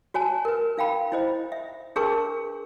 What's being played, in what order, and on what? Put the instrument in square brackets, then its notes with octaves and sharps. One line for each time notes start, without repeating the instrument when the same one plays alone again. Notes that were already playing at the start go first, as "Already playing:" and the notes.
[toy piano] F#4 C#5 G#5 A5
A#4 B4
D#4 F5 G5 B5
E4 C5 D#5
E5
D4 G#4 A#4 B4 A5 C#6